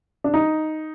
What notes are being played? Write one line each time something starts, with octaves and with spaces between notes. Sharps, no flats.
D4
D#4